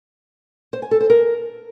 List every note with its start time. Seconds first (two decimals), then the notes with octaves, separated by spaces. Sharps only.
0.73 C5
0.82 G#5
0.91 A4
1.01 C5
1.10 A#4